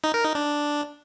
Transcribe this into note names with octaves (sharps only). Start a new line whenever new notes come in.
D#4
A#4
D#4
D4